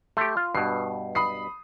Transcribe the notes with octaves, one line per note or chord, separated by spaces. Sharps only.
A3 G4 C6
F4
G2 B2 C7
B5 D#6 C7